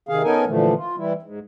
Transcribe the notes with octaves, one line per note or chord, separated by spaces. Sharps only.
C3 D#3 G#4 F5
B3 C#4 D#4 A4 A#4 G#5
A#2 D3 E3 F3 A3
F4
E3 G3 E4
G#2